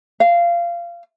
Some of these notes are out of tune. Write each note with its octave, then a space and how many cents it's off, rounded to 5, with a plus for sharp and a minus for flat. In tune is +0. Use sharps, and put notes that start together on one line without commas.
F5 -20